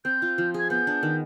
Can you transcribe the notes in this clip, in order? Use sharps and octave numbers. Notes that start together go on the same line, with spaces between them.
C4 G6
F4
F3
G#4 G#6
B3 G6
D4
D#3